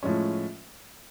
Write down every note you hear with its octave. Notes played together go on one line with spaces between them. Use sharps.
A2 F3 G#3 C#4